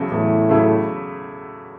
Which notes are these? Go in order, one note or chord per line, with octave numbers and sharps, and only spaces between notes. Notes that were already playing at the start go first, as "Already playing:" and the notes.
Already playing: E2 C#3 F#3 A3 E4
E2 A2
C#3 F#3 A3 E4